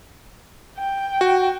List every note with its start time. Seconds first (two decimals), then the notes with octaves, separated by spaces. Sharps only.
0.78 G5
1.21 F#4